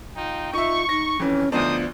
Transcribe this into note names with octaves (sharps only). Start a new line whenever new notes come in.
D#4 F4 G5
D#4 F4 E5 C#6
D#4 A#6
F2 E3 C#4
D2 F3 B3 D4 D#4 C5 D#6